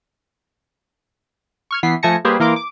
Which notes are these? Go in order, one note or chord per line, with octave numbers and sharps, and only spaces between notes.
C#6 F6 G#6
E3 B3 B6 C7
F3 A3 G#5 A5 A#6 C#7
G3 A#3 G4 G#4 B4 C5
E3 A#3 A#4 C6 D6
D6